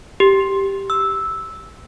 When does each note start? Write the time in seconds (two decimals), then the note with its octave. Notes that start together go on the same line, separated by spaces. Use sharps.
0.20 G4
0.90 E6